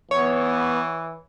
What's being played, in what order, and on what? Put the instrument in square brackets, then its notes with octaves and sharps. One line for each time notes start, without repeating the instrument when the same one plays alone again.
[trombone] E3 [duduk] B3 [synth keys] C#5